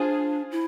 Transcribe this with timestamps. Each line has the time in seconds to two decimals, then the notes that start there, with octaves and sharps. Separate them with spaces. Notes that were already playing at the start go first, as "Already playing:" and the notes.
Already playing: D4 F4 G#4 C5
0.52 E4